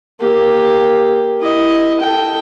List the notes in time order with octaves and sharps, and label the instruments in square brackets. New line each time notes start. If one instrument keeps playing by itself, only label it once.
[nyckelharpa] A#3 G4
E4 D#5
A4 G5